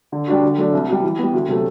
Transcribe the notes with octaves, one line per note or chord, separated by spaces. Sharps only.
D3
G3 D4 F#4
D3
F#3 A3 D4
C2
B2 G3
E3
G3 B3
D2
C3 F#3 A3